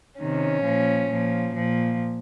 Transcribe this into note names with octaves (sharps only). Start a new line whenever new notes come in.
C3 D#3 C#4
A#2 F3
A#2 F3
A#2 F3